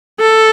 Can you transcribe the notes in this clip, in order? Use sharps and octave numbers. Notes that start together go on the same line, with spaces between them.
A4